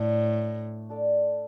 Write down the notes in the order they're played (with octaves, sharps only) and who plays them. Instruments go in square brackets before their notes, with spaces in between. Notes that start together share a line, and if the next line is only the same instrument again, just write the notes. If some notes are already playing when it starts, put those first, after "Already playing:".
Already playing: [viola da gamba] A2 [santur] A3 D4 A4
[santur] D4 A4 D5 F5